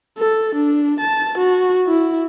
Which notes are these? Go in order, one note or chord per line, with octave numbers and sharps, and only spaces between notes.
A4
D4
A5
F#4
E4